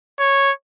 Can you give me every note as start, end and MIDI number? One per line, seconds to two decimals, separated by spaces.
0.19 0.51 73